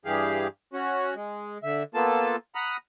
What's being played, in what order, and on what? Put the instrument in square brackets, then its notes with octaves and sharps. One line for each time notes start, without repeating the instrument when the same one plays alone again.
[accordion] G2 E3 G4 G#4 F5
C#4 F#4
G#3
D3 E5
A#3 B3 F4 A4 A5
F#5 A#5 B5 D#6 F6